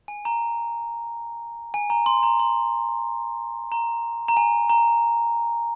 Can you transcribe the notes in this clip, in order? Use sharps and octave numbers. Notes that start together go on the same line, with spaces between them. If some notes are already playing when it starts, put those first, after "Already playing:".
G#5
A#5
G#5
A#5
C6
A#5
C6
A#5
A#5
G#5
A#5